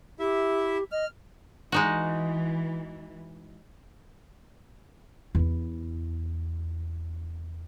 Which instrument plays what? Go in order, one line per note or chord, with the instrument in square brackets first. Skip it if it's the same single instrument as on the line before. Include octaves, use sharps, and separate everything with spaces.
[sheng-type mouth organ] E4 E5 [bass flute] G4
[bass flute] D#5 [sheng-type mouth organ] F6
[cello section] E3 [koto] G#3 D#4 F#4
[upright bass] E2 E4